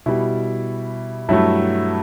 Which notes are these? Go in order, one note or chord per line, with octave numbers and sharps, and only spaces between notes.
B2 G3 E4
G2 F#3 A3 E4